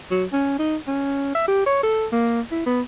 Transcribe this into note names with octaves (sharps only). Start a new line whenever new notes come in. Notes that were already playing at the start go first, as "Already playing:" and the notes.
F#3
C#4
D#4
C#4
E5
G4
C#5
A4
A#3
E4
B3